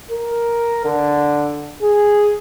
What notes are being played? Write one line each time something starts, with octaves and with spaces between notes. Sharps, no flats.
A#4
D3
G#4